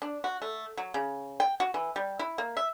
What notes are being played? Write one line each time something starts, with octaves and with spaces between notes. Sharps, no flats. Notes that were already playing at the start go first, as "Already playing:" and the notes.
D4
F#4
A3
F#3
C#3
G5
F#4
E3
G3
E4
A#3
E5